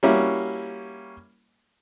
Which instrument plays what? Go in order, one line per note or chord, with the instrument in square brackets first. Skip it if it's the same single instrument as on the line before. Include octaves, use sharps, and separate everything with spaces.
[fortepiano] G3 A#3 C#4 E4 F#4